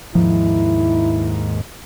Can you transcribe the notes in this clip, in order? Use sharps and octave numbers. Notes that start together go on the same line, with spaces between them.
D#2 G#2 F3 E4